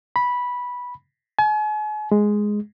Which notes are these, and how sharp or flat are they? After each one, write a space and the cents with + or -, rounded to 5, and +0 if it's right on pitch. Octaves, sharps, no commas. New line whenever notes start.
B5 -10
G#5 +40
G#3 +0